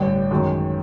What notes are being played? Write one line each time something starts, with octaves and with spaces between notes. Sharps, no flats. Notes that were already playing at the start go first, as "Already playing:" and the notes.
Already playing: A1 G2 D3 G5
F#2 D#3 G#3